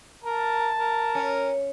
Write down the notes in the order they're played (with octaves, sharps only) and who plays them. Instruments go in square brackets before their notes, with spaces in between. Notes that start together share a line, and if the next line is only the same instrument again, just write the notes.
[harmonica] A#4 [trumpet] A5
[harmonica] A#4
[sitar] C#4